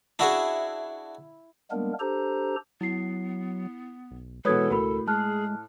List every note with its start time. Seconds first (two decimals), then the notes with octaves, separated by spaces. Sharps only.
0.19 D4 E4 F#4 G#4
1.71 G3 G#3 A#3 B3 D4 A#4
2.00 D4 G4 A4 C5 A#5
2.81 F#3 B3 E4 C7
4.11 B1
4.45 B2 E3 G#3 A4 B4 C#5 D#6 G#6
4.71 C#2 A2 F#4 A#4 B5
5.07 G#3 G#4 A5 F6 F#6